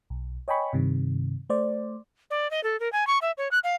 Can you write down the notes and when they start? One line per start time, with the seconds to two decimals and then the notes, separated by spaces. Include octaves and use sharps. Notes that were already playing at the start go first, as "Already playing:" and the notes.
0.10 B1
0.48 C#5 D#5 G5 G#5 B5 C#6
0.73 G2 C3 D#3
1.50 A3 C5 D5
2.30 D5
2.51 D#5
2.64 A4
2.80 A#4
2.93 G#5
3.07 C#6
3.22 E5
3.38 C#5
3.51 F#6
3.64 F5